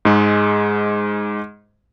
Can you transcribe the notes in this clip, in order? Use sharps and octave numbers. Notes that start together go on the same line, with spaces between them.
G#2 G#3